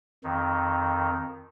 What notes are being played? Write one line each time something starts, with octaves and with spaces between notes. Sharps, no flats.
F2 D#3